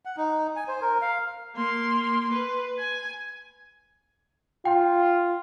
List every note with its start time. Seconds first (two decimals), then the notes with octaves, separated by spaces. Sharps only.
0.05 F#5
0.17 D#4
0.56 G#5
0.68 C5
0.82 A#4
1.02 F5
1.55 A#3 C6
2.33 B4
2.79 G#5
4.65 F4 G5